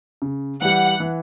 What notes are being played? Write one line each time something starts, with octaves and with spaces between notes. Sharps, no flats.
C#3
E3 G3 F#5
E3